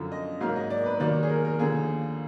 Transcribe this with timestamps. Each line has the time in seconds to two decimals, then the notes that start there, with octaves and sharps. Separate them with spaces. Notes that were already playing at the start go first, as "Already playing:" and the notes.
Already playing: F#2 D3 F3
0.12 D#5
0.40 G#2 F#3 A#3 F5
0.56 D#5
0.70 D5
0.86 B4
1.00 D#2 D#3 F#3 D5
1.23 G#4
1.29 A#4
1.45 A#4
1.59 D#2 D3 F3 G#4